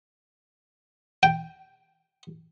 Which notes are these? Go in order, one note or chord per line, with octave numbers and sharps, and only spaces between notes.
G5